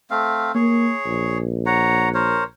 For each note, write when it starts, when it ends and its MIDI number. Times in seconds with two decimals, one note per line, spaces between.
0.10 0.52 57
0.10 0.52 60
0.10 0.52 77
0.55 0.92 58
0.55 1.38 68
0.55 1.38 73
1.06 2.47 34
1.66 2.09 73
1.66 2.09 78
1.66 2.09 82
2.14 2.44 70
2.14 2.44 72
2.14 2.44 73